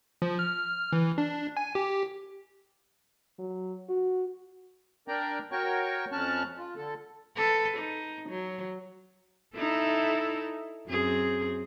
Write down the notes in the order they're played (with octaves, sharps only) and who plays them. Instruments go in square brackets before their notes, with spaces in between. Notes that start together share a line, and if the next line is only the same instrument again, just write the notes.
[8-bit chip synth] F3
F6
E3
D4
G#5
G4
[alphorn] F#3
F#4
[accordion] D4 A#4 D5 G5 A#5
F#4 A#4 C#5 G5 C#6
F2 C#4 A5 C#6 F6 F#6
F4
D3 A4
[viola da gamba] A4 B4
D#4
F#3
D#4 E4 A4
F#2 C4 G#4